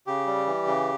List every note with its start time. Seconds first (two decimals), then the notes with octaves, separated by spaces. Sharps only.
0.07 C#3 G4
0.27 G3
0.46 E3
0.67 C#3